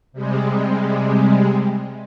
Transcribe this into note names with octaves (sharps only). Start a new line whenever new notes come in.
C3 G3 G#3